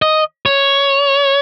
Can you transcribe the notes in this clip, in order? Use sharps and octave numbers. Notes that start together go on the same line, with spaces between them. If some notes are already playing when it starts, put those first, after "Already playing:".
D#5
C#5